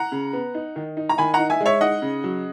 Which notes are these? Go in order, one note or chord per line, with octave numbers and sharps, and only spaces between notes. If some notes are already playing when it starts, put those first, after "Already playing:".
Already playing: F#5 A#5
C#3
B3
D#4
D#3
D#4
A#5
D#3 G#5 B5
F#5 A#5
D#4
E5 G#5
G#3
C#5 E5
D#4 D#5 F#5
C#3
F#3